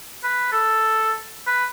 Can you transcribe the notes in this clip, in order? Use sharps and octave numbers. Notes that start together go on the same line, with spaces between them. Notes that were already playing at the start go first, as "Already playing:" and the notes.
B4
A4
B4